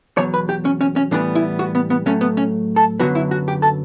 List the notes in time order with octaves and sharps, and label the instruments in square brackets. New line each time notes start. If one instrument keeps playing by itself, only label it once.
[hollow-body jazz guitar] E2 B2 F#3 C#5
B4
G4
C#4
C#4
C#4
A2 E3 G3 B3 D4
E4
F#4
B3
B3
A2 F#3 A3 C#4
B3
C#4
A4
F#2 D3 F#3 B3 F#4
E4
F#4
G4
A4